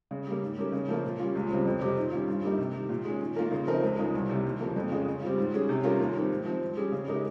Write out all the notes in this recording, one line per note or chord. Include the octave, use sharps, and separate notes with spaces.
C#3
G3 A#3
G#2
G3 C#4 G4 A#4
C#3
F3 A#3 F4
A#2
G3 C#4 F4
C#2
C#3 G3 C4
F2
C3 G3 C4 G4
D#3
G3 C#4 F4
G2
G3 A#3 D#4
C3
D#3 G3
A#2
G#3 C#4
D#3
A#3 F4 A#4
C#3
F3 C4 D#4 A#4
C#2
C#3 G#3 D#4
C2
C3 G3
D#2
C#3 F3 A#3
F2
C#3 G#3 C#4 F4
C#3
G3 C4 F4
G#2
G3 C#4 G#4
C3
G3 C#4 F4 A#4
D#2
D#3 G3 C4
G#2
F3 C4
G#2
G3 C#4 G#4
C#3
G#3 D#4 G4 A#4